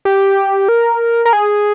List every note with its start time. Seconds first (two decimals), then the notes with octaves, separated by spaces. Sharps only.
0.05 G4
0.68 A#4
1.25 A#4
1.33 G#4